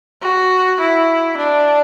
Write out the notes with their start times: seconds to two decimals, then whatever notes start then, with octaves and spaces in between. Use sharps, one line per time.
0.22 F#4
0.80 E4
1.37 D4